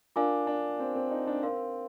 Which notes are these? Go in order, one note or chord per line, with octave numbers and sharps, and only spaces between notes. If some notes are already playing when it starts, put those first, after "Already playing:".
D4 F4 A#4 F5 G#5 D6
D4
C4
C4
D#4
D4
C4 A#4 F5 C6